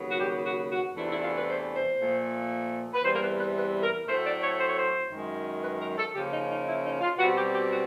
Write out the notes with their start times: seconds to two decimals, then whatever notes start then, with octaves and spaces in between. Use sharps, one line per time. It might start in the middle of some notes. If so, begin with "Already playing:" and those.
Already playing: D#2 C#3 F#3 B3
0.09 F#4
0.19 G4
0.45 F#4
0.70 F#4
0.96 E2 C3 E3 A3 D4 E4
1.09 E4
1.22 F4
1.35 B4
1.48 C5
1.74 C5
2.00 A#2 F3 A3
2.94 B4
3.04 E2 C3 E3 G3 C5
3.15 A#4
3.21 B4
3.38 B4
3.56 B4
3.82 A#4
4.07 A2 F#3 A3 C4 C5
4.24 D5
4.42 C#5
4.59 C5
4.68 C#5
4.77 C5
5.11 F#2 D#3 G#3
5.63 B4
5.80 A#4
5.98 A4
6.15 C#3 F3 A#3 C#4 G4
6.32 D#4
6.49 D#4
6.67 E4
6.84 D#4
7.01 F4
7.19 B2 G3 C4 F#4
7.36 G4
7.53 G4
7.70 F#4